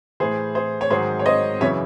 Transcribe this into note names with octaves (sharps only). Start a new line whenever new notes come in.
A2 E3 G#4 C5
G#4 C5
C#5
G#2 D#3 F#3 G#4 C5
C#5
C5 D#5
F#2 C#3 E3 C#5 E5